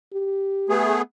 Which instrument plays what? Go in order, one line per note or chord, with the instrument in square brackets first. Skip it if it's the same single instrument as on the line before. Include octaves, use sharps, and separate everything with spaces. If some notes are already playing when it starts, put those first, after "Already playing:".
[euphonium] G4
[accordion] A3 B3 G#4